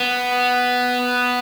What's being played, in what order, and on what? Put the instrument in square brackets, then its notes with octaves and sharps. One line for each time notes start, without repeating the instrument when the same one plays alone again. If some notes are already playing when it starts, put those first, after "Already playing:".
Already playing: [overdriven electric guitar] B3